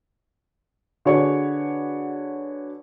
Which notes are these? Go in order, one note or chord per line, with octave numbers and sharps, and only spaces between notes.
D3 F#4 G#4 B4 C#5 C#6